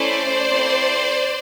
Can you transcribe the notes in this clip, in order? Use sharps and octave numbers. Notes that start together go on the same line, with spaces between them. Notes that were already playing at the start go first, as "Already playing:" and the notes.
Already playing: A3 C#4 E4 A4 C5 D5
C4 E4 A4